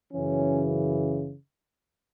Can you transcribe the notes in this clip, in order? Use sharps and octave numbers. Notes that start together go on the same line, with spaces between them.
F#2 C#3 E3 C#4